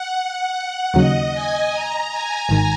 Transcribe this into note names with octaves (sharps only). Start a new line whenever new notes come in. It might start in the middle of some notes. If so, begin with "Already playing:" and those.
Already playing: F#5
D#2 C#3 F#3 D#5
G#5
A#5
G#5
G#1 G#2 D#3